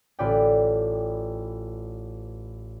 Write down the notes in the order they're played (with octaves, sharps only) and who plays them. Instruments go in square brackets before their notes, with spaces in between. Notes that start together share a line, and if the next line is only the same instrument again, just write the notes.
[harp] A1 F4 B4 D5 G5